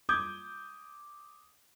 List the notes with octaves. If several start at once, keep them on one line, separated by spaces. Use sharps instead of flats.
D6 D#6 G6 G#6